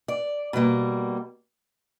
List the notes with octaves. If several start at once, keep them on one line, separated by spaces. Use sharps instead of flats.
D5
B2 G3 A#3